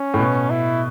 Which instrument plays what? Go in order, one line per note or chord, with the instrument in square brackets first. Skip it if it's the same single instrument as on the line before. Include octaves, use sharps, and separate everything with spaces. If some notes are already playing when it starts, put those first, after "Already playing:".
Already playing: [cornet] C#4
[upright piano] A2
B2
[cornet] E4